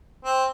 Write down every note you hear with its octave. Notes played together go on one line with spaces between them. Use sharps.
C4